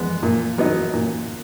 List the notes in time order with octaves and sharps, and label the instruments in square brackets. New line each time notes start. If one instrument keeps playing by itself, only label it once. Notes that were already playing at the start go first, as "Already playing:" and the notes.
Already playing: [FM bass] F3 [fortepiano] G#3 B3
[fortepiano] A#2
F#3 B3 D#4
[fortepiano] A#2 [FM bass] D3